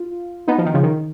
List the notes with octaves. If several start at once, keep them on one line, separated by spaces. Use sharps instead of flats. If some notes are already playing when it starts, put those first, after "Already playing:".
Already playing: F4
B3 D#4
F3
D#3
C#3 F3
D#3